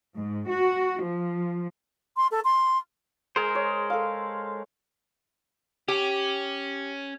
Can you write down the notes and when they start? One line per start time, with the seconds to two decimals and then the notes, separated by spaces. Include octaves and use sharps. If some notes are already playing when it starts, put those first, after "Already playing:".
0.16 G#2
0.48 F#4
1.02 F3
2.17 C6
2.31 A4
2.44 C6
3.36 G#3 G#4 A#4 C5
3.55 C#5
3.90 A4 F5
5.88 C#4 G4